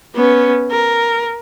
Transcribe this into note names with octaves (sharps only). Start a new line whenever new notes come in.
B3 C#4
A#4